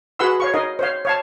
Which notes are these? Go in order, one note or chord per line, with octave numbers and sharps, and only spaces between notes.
F#4 G#4 B4 F#5 C6 E6
C#5 F5 C#6
D#4 A#4 D#5 F5
C5 C#5 F5
C#5 F5 A5